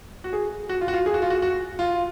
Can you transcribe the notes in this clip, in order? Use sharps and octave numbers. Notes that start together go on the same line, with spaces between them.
F#4
G#4
F#4
F4
F#4
F4
G#4
F#4
F4
F#4
F#4
F4